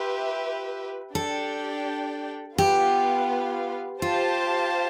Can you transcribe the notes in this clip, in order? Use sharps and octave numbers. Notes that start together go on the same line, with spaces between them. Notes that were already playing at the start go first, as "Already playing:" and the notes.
Already playing: F4 G4 B4 E5
D4 G4 A4 D5 G5
B3 F4 G4 B4 F5
F4 G4 C5 F5 A5